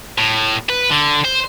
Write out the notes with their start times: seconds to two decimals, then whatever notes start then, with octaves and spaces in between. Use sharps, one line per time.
0.18 A2
0.70 B4
0.91 D3
1.25 C5